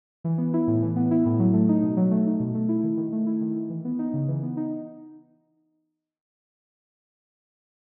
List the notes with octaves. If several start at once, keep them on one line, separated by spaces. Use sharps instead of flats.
E3
B3
E4
A2
E3
B3
E4
A2
F#3
A3
D#4
B2
F#3
A3
D#4
B2
A3
E4
D#3
D#3
A3
E4
D#3
D#3
E3
B3
D#4
C#3
E3
B3
D#4